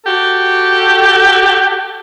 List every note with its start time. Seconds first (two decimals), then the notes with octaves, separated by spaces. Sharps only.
0.05 F#4 G4 A4